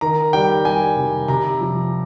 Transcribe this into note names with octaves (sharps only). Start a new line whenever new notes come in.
D#3 A#5
G3 G5
G3 G#5
C3
C3 A#5
F3